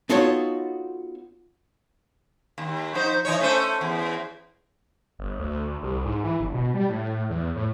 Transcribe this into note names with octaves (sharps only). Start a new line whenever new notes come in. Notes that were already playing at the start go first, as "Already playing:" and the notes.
B3 D#4 F4 F#4 A4 C#5
D#2
F3 D#4 C5
E3 D#4 C#5
A3 C#4 C5
E2
G1
D2
C2
G#2
E3
G1
B2
G3
A2
E2
A2